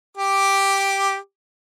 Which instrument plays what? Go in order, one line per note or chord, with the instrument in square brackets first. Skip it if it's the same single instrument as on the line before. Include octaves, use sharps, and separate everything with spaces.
[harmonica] G4 D6